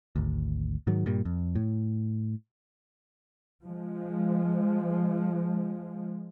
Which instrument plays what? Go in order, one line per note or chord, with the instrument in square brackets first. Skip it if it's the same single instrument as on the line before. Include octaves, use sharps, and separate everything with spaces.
[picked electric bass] G#1 D2
G#2 D#3 F#3
G2 A#2 G3
F2
A2
[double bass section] F3 G#3